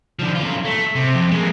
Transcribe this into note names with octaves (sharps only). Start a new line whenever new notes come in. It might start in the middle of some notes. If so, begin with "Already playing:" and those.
D3 F3
F#2 F4
A3
C3
F2
G#3 A#3